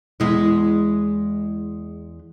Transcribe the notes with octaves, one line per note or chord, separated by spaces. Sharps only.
E2 G#3 E4